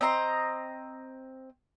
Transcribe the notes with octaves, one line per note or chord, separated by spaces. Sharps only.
C4 D#5 A#5 C6